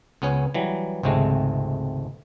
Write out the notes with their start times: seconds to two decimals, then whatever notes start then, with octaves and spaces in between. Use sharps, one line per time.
0.22 C#2 B3 C#4 C#5
0.54 E3 F#3 G3
1.03 G#1 C#2 C3 G#3 A3